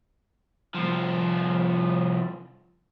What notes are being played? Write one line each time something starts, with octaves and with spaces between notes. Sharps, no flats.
C2 F3